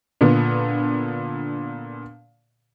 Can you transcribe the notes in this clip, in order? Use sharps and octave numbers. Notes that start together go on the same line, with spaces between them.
A#2 D3 B3